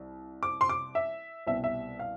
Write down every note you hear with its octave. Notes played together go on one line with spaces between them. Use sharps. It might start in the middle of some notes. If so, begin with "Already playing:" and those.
Already playing: C2
D6
C6
D6
E5
C2 B2 G3 E5
E5
F5